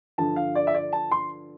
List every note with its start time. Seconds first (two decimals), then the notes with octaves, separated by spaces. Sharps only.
0.18 G2 D3 F3 A5
0.36 F5
0.55 D5
0.67 E5
0.74 D5
0.93 A5
1.11 C6